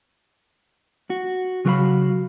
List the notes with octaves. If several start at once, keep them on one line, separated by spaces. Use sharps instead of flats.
F#4
C#3 F#3 F#4 A#4 F5 B5